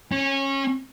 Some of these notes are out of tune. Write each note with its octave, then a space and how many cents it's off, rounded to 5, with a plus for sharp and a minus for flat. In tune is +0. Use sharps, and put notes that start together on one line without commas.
C#4 -20